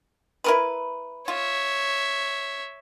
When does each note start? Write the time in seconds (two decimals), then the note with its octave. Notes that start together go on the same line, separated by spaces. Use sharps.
0.44 E4 A#4 B4
1.28 F4 C#5 E5